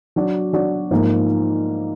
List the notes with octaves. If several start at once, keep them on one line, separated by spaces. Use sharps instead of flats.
F#3 D4 F#4 D5
F#3 D4 F#4 D5
G#2 F3 A#3 F4 A#4